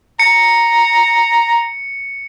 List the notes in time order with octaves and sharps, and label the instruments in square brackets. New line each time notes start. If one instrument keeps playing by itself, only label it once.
[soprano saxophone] A#5 [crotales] C#7